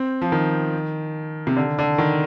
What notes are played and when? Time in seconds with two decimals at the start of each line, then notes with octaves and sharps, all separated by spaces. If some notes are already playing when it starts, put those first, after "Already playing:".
Already playing: C4
0.22 F3
0.32 D#3
1.47 C3
1.56 D3
1.79 D3
1.98 D#3